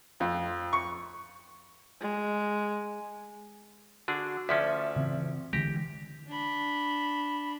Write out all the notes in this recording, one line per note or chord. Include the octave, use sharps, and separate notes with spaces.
F2
C#6
G#3
D3 D4 F#4 G#4
D2 F3 C#4 D5 E5 B6
C#3 E3 C4
D3 E3 G#3 G4 A#6
D4 B5